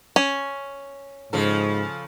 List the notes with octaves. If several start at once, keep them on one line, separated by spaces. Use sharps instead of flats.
C#4
G#2 C#3 F3 A4